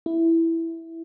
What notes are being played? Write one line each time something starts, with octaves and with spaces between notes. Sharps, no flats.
E4